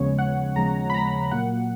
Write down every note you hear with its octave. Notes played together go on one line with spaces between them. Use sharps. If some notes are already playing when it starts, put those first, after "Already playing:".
Already playing: D#2 C#3 F3 G#3 B3 C#5
F#5
D#2 C#3 F3 G#3 B3 A#5
B5
A#5
A#2 F#3 A#3 F#5